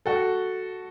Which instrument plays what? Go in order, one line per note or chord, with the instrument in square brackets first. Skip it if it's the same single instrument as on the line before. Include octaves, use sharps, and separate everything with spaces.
[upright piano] F#4 A4